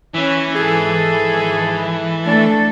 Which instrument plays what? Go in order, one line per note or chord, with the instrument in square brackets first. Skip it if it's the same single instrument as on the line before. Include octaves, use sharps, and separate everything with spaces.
[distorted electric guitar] E3 [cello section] C#4
[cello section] G#2 A4 [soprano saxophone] G#4
[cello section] A3 A4 [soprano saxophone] D4